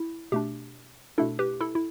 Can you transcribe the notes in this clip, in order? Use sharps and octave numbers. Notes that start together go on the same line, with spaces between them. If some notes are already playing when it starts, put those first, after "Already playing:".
Already playing: E4
B2 A3 D4 G4
B2 A3 D4 E4 A4
G4 B4
E4 A4
E4